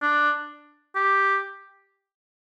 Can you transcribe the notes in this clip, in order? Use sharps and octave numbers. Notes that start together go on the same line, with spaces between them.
D4
G4